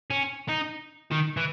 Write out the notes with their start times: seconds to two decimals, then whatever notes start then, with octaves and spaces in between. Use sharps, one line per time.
0.10 C#4
0.49 D#4
1.11 D#3
1.37 E3